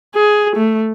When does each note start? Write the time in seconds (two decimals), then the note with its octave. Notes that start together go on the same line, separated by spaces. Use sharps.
0.15 G#4
0.56 A3